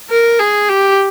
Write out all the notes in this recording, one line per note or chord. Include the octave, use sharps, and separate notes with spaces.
A#4
G#4
G4